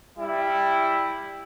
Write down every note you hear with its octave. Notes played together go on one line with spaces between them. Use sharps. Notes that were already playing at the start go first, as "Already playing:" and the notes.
G3 E4